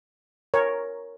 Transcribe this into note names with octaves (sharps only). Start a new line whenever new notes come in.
A#4 C#5